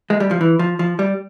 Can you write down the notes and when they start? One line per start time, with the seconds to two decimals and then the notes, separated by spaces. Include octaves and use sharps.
0.10 G#3
0.20 G3
0.31 F3
0.41 E3
0.59 F3
0.79 F3
0.99 G3